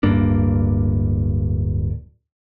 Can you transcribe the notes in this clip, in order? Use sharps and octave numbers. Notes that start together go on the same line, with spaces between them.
D1 G2 A#3 D4